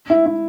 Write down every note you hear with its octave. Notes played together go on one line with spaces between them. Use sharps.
E4
E4